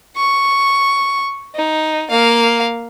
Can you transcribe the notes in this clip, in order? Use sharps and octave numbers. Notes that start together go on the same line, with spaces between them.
C#6
D#4
A#3 F5